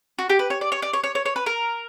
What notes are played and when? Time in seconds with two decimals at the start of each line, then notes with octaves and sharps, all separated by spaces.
0.19 F#4
0.29 G4
0.39 B4
0.50 C#5
0.61 D5
0.72 C#5
0.82 D5
0.93 C#5
1.04 C#5
1.15 C#5
1.25 C#5
1.36 B4
1.46 A#4